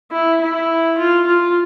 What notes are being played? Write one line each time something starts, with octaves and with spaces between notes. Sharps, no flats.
E4
E4
F4
F4